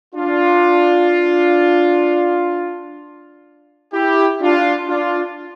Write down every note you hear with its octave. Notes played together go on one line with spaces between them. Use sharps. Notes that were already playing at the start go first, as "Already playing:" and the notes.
D4 F4
E4 G4
D4 F4
D4 F4